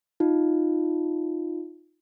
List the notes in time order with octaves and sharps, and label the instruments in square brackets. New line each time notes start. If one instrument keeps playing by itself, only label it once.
[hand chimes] D#4 F4